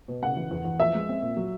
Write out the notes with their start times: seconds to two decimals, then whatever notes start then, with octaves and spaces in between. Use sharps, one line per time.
0.08 B2
0.23 C#3 F#5
0.37 E3
0.51 E2
0.65 E2
0.80 F3 E5
0.95 G#3
1.09 C4
1.22 A#2
1.37 F#3